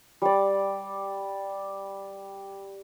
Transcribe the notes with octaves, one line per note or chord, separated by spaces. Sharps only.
G3 D5